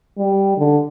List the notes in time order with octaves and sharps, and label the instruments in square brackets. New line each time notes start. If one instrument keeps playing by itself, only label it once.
[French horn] G3
D3